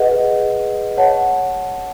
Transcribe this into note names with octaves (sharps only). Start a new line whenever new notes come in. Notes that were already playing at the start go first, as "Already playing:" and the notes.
Already playing: G#4 B4 D#5 F#5
C#5 F#5 A5